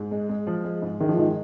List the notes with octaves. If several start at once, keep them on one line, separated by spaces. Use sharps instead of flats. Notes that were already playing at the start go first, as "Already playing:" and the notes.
Already playing: G#2
G#3
G#3
F3
G#3
G#2
D#3 G#3
F3
G#2 D#3